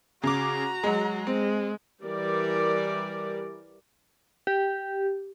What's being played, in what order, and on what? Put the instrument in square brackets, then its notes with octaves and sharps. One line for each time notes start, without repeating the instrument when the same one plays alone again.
[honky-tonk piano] C#3 D6 [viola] F#4 A#5
[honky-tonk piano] F#3 G#3
[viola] G#3 [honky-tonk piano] C4
[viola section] E3 G3 A#4 D5
[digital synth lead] G4